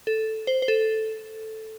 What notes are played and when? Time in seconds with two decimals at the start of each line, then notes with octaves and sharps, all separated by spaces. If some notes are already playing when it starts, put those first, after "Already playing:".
0.07 A4
0.47 C5
0.62 C5
0.68 A4